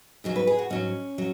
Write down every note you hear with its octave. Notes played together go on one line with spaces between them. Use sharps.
G#2 F#3 G#4
B4
G#4
F#4
G#2 F#3 C#4
F#3